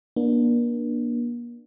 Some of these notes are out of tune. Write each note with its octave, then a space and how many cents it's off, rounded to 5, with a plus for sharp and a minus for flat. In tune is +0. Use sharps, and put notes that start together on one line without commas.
A#3 +40 D4 +15